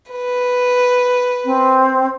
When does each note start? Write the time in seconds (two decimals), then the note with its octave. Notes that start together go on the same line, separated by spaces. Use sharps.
0.10 B4
1.45 C4